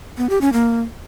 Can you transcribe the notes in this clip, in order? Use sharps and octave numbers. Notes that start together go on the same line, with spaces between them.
B3
G4
C#4
A#3